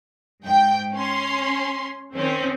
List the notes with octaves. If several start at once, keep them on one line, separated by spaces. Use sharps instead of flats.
G#2 G5
C#4 C6
D#3 C4 C#4